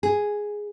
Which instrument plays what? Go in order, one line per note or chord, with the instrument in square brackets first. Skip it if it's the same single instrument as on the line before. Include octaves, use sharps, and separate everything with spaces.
[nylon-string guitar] G#4